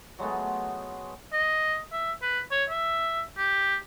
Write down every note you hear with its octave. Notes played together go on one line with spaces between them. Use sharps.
F#3 G#3 A3 B3
D#5
E5
B4
C#5
E5
G4